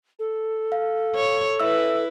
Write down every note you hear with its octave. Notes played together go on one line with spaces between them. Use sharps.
A4
F5
C#5
E4 B4 E5 E6